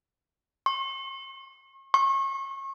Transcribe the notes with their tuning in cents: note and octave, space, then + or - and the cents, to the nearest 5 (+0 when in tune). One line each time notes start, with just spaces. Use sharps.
C#6 -40
C#6 -35